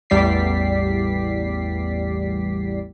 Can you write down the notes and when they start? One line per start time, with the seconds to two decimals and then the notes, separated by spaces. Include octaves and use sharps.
0.10 A1 E2 G3 D5 B6 C7